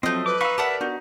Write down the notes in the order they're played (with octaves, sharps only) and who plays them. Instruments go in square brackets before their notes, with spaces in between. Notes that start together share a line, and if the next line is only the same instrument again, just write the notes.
[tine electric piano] F3 F#3 [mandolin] A3 D#5 [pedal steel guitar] C4
[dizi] B4 [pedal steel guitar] D6
[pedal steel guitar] D#4 C#6 [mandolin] F5 [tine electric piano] B5 E6
[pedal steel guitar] G4 A#4 D5 [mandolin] E5 F#5 A5
[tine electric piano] B3 D4 F#4 [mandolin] D#4